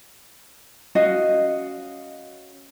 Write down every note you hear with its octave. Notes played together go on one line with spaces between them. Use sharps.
C#4 F#4 D#5 F5